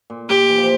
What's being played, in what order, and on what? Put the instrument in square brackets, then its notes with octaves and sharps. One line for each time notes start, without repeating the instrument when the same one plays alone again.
[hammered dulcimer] A#2
[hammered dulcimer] A#2 [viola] G4
[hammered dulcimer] E3
F3